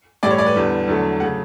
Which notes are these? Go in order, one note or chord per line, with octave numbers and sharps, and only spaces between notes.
A2 E3 G3 D5
C#5
D5
B4
E2 D3 G3
E2 D3 F#3 A3
C#3 F#3 A3 F#5